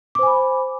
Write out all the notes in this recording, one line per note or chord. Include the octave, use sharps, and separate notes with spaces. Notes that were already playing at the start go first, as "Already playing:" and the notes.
C5 G#5 B5 D6